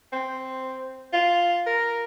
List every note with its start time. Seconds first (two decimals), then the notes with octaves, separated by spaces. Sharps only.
0.13 C4
1.13 F4
1.66 A#4